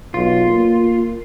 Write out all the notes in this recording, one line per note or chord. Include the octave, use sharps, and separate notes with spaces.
B1 F4
A#3